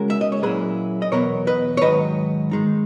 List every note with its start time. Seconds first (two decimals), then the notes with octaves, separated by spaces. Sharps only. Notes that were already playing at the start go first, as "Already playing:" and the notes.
Already playing: C#3 G#3 C#4 F#4 A#4
0.10 E5
0.21 D#5
0.32 C#5
0.42 A#2 F#3 A#3 C#4 E4 G#4 B4
1.02 D#5
1.12 E2 B2 F#3 B3 A#4 C#5
1.47 B4 D#5
1.77 C#5
1.81 G#2 D#3 F#3 B4 D#5
2.51 D#3 G#3 D#4